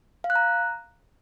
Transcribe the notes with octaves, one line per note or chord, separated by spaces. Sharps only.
F5
F#6
A#5